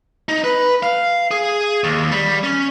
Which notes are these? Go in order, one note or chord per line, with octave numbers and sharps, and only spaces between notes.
D#4
B4
F5
G#4
D#2
G3
C#4